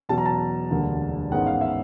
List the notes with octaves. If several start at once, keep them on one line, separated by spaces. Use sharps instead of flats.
E2 B2 F#3 A5
A#5
A5
E1 D2 D3 G3 A#3
A1 G#2 D#3 G#3 B3 F#5
F5
E5